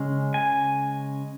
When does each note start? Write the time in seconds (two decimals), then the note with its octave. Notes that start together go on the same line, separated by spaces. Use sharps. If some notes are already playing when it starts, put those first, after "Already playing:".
Already playing: C#3 G#3 C#4
0.34 G#5